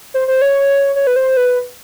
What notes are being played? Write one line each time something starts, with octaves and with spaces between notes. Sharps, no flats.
C5
C5
C#5
C#5
B4
C5
B4